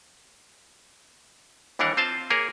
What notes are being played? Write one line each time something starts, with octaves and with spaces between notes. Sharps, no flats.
D#2 E3 G3 D4 A#4 F#5
C4 F4 C5 F5 A5
A#3 G#4 A#4 C#5